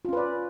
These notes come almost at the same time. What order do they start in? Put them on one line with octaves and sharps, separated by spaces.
F4 C#4 B4 D5